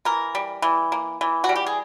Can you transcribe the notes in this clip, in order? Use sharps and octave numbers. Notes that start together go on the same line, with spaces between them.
E3 A#4
G3
E3
A#3
E3
F#4
G3
G4
G#4